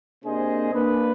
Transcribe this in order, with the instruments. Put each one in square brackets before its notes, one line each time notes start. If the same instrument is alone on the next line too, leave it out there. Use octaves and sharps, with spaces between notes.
[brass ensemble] C3 A#3 D4 G#4 C5 D#5
A#3 D4 B4